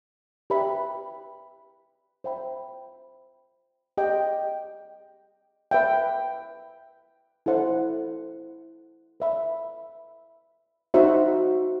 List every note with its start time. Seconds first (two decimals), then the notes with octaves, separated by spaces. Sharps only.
0.50 G4 B4 E5 B5
2.24 C5 E5 G5 B5
3.97 G4 D#5 G5
5.71 B4 E5 G5
7.46 E4 A4 C5 F#5
9.20 B4 E5 B5
10.94 D#4 F#4 C5 E5